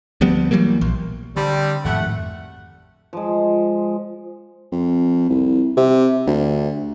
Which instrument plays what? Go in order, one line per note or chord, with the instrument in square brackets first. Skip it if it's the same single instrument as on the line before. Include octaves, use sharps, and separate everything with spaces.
[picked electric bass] D2 F3 G3 B3
E3 F#3 G3 A#3
A#1
[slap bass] D3 [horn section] G3 C4
[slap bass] G#1 F2 A2 [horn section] A3 F#5
[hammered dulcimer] F3 G#3
[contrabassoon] F2
C2
C3
D2